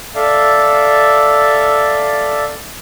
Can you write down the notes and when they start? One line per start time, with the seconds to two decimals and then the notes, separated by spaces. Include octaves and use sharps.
0.15 A4 D5 E5 F5